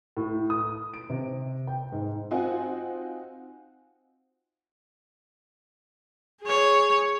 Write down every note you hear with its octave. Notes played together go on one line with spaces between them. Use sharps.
A2
D#6
D7
C3
G5
G#2
C4 D#4 F4 F#4 F#5 G#5
G#4 C#5